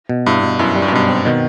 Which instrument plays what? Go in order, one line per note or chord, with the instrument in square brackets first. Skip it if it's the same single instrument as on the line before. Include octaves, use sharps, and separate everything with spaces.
[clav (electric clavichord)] B2
[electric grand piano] G2 [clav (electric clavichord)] E4
[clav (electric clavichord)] B2
[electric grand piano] F#2 [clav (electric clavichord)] E4
[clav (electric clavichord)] G3
[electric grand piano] G2
F#2
[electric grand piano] G2 [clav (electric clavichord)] B2
[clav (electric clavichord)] C4
[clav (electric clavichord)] B2 [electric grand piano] D#3